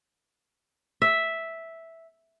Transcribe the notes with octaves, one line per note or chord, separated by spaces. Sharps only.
E5